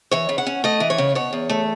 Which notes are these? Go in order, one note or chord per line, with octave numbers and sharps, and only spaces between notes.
E3 C#5
C#3
F#5
C#4
A3 D#5
E3
C#5
C#3
B2 C#5
E2
A3